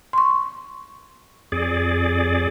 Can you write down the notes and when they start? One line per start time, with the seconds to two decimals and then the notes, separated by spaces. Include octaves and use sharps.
0.13 C6 C#6
1.52 F2 G#4 D5